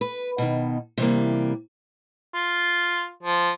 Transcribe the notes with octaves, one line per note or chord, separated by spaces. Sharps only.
B4
B2 D#3
C3 E3 G3 A#3
F4
F3